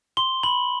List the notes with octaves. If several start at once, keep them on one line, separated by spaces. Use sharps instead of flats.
C6 G7
B5 F#7